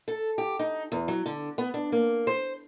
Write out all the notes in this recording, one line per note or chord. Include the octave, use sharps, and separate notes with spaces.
A4
G4
D#4
E2
F#3
D3
B3
D4
A#3
C5